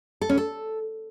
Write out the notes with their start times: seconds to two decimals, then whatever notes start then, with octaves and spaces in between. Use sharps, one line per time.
0.21 A4
0.29 C#4
0.37 A4